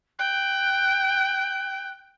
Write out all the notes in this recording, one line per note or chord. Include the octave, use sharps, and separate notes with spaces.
G5 F#6